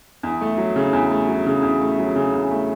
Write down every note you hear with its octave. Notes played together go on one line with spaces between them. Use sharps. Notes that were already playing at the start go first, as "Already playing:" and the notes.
E2
A3
F#3
C#3
E2
A3
F#3
C#3
E2
A3
F#3
C#3
E2
A3